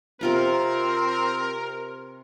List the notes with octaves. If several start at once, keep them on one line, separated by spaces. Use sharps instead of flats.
C3 C4 F4 A#4 A#5